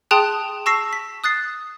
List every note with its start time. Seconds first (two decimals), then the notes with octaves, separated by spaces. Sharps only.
0.11 G#4 G5 A5 C6 D#6 F#6
0.66 A5 C#6 E6 A#6 C7
0.93 B6
1.24 D#6 F#6 A6 C7